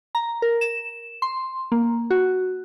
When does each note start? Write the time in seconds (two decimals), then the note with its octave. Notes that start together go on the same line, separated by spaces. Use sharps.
0.15 A#5
0.42 A#4
0.61 E7
1.22 C6
1.72 A#3
2.10 F#4